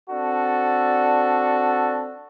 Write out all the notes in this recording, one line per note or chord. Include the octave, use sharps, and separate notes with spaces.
C4 D4 F#4 A4